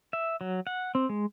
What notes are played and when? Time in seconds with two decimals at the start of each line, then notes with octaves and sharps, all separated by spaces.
0.13 E5
0.41 F#3
0.67 F#5
0.95 C4
1.09 G#3